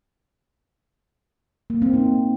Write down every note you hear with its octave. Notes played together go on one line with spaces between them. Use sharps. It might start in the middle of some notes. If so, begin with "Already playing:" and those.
A#3
C4
D#4